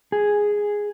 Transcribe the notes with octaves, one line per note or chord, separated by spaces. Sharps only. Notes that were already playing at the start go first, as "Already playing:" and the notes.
G#4